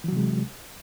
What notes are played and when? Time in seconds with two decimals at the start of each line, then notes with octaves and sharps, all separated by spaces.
0.04 E3
0.08 F#3
0.13 C3
0.17 G#3